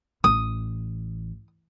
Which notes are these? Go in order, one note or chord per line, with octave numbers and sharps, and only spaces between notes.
A1 D#6